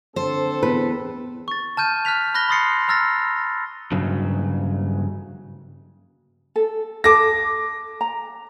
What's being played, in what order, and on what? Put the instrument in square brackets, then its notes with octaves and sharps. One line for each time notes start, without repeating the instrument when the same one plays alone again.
[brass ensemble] D3 C4 A4 [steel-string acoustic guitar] C5
[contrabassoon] E2 [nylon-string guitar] B4
[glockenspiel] C#6 A6
A5 F6 G6 D#7
F6 F#6 B6 F7
B5 F6 F#6 A#6 G7
B5 C6 D#6 A6 C7 C#7
A#5 E6 F6 A6 A#6
[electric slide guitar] G2 C#3 F#3
[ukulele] A4
[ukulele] A4 A5 [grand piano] D6 A#6
[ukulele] A#5